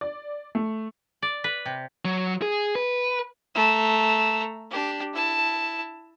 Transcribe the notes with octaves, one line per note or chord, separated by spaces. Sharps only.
D5
A3
D5
B4
C3
F#3
G#4
B4
A3 A#5
D4 G4
E4 A5